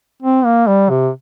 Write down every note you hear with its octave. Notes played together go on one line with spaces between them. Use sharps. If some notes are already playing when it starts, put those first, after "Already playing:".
C4
A#3
G3
C3